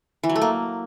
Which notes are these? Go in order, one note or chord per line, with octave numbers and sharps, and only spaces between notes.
E3
F#3
A3
A#3